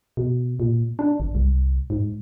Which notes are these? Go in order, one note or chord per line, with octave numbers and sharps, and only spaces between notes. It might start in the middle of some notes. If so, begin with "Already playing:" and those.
B2
A#2
D4
G1
C2
G#2